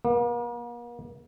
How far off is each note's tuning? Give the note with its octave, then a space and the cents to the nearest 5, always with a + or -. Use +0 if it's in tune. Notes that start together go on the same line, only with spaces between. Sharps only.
A#3 +45